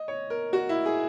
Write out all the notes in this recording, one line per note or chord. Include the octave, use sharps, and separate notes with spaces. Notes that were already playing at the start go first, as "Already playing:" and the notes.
Already playing: D#5
C#5
A#4
F#4
E4
G#4